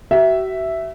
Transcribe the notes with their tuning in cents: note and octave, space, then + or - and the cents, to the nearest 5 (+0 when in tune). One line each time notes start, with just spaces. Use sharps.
F#4 +45 E5 +0